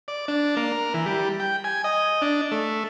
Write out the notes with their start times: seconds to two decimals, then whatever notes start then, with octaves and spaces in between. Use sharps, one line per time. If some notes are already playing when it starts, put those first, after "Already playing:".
0.08 D5
0.28 D4
0.57 A#3
0.72 A#4
0.94 E3
1.06 G3
1.40 G5
1.64 G#5
1.84 D#5
2.22 D4
2.52 A3